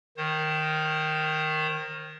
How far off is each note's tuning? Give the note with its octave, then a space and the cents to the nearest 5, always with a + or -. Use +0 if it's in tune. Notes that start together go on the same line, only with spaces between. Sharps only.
D#3 +0 C5 +35